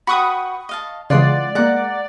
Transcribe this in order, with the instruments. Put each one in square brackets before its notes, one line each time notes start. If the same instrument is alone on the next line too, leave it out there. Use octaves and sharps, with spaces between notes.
[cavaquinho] F#4 B4 G5 [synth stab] B5 C#6 D#6
[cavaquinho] D#5 F5 A5
[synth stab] C#3 E3 G#3 [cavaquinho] F4 F#5 C6 [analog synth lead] D5
[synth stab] G#3 A#3 [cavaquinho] F#5 A#5